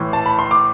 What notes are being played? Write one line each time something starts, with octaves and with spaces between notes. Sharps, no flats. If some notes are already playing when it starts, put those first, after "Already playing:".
Already playing: A2 E3 C6
A5
B5
C6
D6